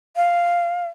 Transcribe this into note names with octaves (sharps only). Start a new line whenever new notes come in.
F5